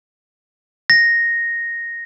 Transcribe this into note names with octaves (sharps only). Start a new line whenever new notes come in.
A#6